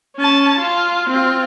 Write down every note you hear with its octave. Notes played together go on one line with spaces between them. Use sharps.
C#4 A5
F4
C4 F4